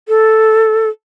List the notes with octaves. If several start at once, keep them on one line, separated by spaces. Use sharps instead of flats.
A4